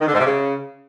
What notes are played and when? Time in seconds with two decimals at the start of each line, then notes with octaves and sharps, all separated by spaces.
0.01 D#3
0.07 D3
0.14 G#2
0.20 C3
0.26 C#3